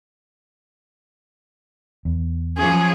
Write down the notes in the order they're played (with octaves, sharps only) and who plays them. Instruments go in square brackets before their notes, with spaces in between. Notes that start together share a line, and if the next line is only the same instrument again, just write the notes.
[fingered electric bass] E2
[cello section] F3 F#3 C#4 [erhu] G#4